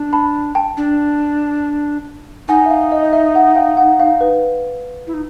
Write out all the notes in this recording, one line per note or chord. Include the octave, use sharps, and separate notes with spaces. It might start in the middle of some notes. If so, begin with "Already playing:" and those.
Already playing: D4
A5 B5
G5 A5
D4
D#4 F#5 G#5
E5
F5
D#5
E5
F#5
F5 G5
F#5
F5
B4
E4
D#4